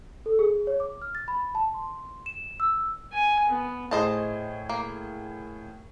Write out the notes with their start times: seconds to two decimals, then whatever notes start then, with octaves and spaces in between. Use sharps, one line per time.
0.26 A4
0.39 G#4
0.67 C#5
0.80 D6
1.02 F6
1.15 A6
1.28 B5
1.55 A5
1.74 C6
2.26 E7
2.60 E6
3.12 G#5
3.49 B3
3.91 A2 G#4 C5 D#5 A5
4.69 A#3